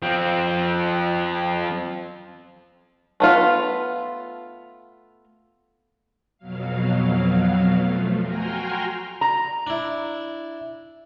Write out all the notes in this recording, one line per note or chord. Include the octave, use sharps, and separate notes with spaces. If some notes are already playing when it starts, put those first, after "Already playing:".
F3 C4
A3 B3 F4
F2 B2 F#3 F5
F3 A3
F#4 G5 G#5 A#5 C6 F6
A#5
D4 E4